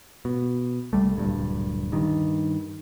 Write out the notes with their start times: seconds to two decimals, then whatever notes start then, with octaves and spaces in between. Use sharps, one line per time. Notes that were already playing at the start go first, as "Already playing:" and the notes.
0.25 B2
0.93 C2 F2 G3 A3
1.16 D1 G2 A#2
1.92 G2 D#3